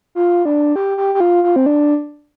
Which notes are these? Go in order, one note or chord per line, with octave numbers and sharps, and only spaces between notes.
F4
D4
G4
G4
G4
F4
F4
C4
D4